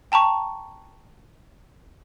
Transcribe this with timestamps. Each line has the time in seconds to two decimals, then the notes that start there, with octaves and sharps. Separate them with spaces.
0.12 G5 A5 A#5 C#6